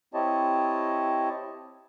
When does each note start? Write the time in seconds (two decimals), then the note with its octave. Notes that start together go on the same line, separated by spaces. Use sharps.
0.14 C4 E4 G4 C#5 D#5 A5